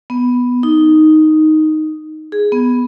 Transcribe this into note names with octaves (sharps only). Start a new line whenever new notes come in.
B3
D#4
G#4
B3